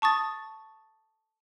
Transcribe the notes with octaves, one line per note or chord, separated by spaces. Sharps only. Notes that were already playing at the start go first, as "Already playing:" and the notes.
A5 C#6 D#6 A6